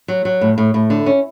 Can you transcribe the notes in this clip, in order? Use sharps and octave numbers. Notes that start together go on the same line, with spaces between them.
F#3
F#3
A2
A2
A2
D3
C#4